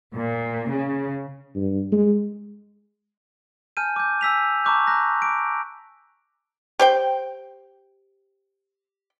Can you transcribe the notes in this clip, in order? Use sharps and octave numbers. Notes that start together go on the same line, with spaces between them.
A#2
C#3
G2
G#3
G#5 A5 F6 G6 D#7
D6 G6
G#5 E6 B6 F7
A5 A#5 C#6 D6 F#6 G6
A#5 F#6 A#6
D6 D7
G4 C5 G5